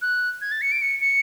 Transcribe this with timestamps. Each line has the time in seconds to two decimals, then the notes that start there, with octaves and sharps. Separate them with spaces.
0.01 F#6
0.41 G#6
0.51 A6
0.61 C#7
0.71 D7
0.81 C#7
1.01 C#7